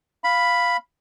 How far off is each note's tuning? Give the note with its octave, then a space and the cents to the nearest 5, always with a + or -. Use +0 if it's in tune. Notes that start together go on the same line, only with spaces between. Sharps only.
F5 +0 B5 +0